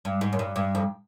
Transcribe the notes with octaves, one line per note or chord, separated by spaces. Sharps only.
G2
G#2
F#2
G2
G2
F2